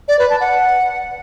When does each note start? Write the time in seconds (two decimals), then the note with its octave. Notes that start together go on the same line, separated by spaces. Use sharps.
0.08 D5
0.19 B4
0.30 A5
0.41 F#5